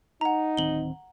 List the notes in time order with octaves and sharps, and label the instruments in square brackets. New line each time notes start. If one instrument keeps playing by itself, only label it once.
[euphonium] D#4 [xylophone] F#5 A#5
[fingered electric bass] D1 D#3 C4 [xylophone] F#7 G7